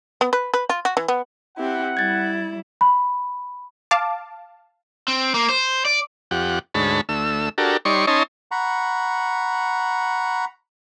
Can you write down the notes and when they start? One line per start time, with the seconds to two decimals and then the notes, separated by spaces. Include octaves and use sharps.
0.21 B3
0.33 B4
0.54 B4
0.69 F4
0.85 F#4
0.97 E3
1.08 B3
1.57 C4 E4 G4 F#5
1.97 G3 E4 G#6 A6
2.81 B5
3.91 F5 A5 D6
5.08 C4
5.34 A#3
5.49 C5
5.85 D5
6.31 F2 G4 F#5
6.74 D2 G#2 C#5 A5 B5
7.09 D2 A3 E6
7.58 D4 F#4 G4 A4 A#4
7.85 G3 D#4 C#5 D5 C6 C#6
8.07 C#4 D#4 C#5 D#5 A5 C6
8.51 F#5 A#5 B5 C#6